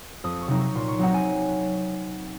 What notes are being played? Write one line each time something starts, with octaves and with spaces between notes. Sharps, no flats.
F2 D#6
C#6
C3 F#3 C4 D#4
C#6
A#2 C6
C#6
F#3 C4 D#4 F#5
G#5